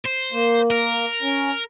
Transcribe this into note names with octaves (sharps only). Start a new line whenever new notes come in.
C5
A#3
A#4
C#4